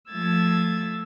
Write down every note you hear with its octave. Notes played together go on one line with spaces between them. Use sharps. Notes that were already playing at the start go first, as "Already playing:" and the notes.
F3 A3 E6 G#6 A6